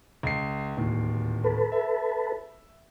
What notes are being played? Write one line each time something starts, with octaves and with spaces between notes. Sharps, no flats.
C#2 C7
D1 D#2 A#2
A4 B4
E5